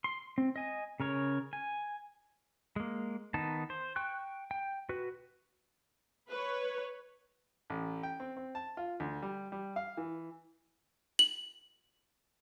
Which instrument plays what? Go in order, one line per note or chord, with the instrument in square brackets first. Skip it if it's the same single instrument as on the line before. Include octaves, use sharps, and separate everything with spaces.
[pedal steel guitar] C6
C4
D#5 G#5
C#3 A#4 C#5
G#5
G#3 A#3
D#3 B3 D#4 A5
C5
G5 C#6 F#6
G5
F#4 B4
[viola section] B4 C#5
[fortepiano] A1
G5
C4
C4
A5
F4
D2
G3
G3
F5
E3
[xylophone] F#7